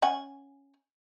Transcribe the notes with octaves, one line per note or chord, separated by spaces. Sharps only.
C#4 F#5 G#5